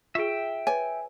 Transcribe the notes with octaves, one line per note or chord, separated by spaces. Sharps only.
F4 G#4 E5 G5
B4 C#5 G#5